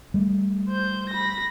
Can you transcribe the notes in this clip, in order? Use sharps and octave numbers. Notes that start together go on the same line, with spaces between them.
G3 A3
C5 G6
B5 A#6